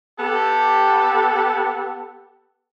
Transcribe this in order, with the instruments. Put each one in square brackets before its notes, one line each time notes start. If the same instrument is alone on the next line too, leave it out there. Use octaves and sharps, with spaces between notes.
[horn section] B3 G4 A4